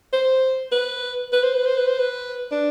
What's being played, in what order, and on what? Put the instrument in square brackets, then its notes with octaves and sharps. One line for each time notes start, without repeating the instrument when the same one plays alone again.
[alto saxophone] C5
B4
B4
C5
B4
C5
B4
C5
B4
D4